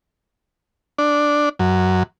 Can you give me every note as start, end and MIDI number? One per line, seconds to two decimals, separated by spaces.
0.98 1.49 62
1.59 2.03 42